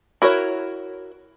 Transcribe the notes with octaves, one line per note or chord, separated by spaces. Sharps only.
E4 F#4 A#4 C#5